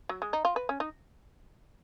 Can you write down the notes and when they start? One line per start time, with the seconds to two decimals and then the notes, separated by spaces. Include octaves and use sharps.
0.09 F#3
0.22 G#3
0.33 D#4
0.45 F4
0.56 B4
0.69 C#4
0.80 D#4